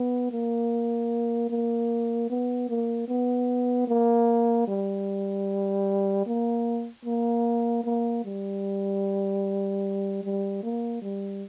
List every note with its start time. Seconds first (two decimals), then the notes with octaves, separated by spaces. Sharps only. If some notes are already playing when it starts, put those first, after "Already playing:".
Already playing: B3
0.31 A#3
1.50 A#3
2.30 B3
2.69 A#3
3.08 B3
3.87 A#3
4.68 G3
6.26 A#3
7.05 A#3
7.84 A#3
8.25 G3
10.23 G3
10.63 A#3
11.02 G3